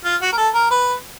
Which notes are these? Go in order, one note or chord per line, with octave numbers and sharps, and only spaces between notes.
F4
F#4
A#4
A4
A#4
B4